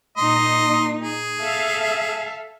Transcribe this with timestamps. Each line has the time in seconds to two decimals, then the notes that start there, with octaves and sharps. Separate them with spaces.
0.17 A#2 D#4 D#5 C6
1.01 G#4
1.41 A4 E5 F5